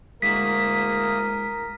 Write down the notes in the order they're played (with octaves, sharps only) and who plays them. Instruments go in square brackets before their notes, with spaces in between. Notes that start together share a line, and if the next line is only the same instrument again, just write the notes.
[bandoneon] D2 A#3 D#6 [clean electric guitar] G#3 E4 F#4 [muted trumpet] A#4 [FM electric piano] B6